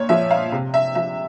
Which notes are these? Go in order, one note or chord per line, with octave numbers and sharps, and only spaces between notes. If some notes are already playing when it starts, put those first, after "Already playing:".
Already playing: A#2 C#5
F3 E5
F5
C3
E5
F3 E5